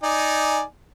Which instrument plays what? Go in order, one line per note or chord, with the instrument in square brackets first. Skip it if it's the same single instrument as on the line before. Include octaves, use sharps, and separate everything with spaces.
[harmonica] D#4 D5 G#5